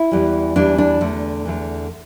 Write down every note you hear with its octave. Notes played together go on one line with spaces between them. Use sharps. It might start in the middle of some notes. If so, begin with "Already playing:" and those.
Already playing: E4
E2 E3 G3
E2 E3 G3 D4
D4
E2 D3 A3
E2 D3 A3